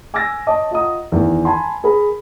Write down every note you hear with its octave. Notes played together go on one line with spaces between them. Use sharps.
G#5 D6 E6 F6 A6 A#6
C#5 D#5 A5 D6 D#6
F4 D#5 F#5 A#5 D#6
E2 D#3 E3
G#5 A5 B5 C6
G#4 A#4 B5